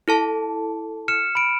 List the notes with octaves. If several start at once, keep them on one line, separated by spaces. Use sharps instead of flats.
E4 A4 A5
F6 C#7 E7
B5 D7